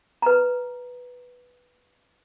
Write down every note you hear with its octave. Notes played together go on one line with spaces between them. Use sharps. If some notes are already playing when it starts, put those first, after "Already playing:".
B4 A#5